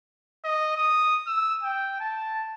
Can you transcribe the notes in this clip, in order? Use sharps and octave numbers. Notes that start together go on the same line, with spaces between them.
D#5
D#6
E6
G5
A5